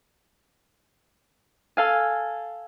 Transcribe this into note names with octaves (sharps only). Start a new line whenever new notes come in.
A4 F5 G#5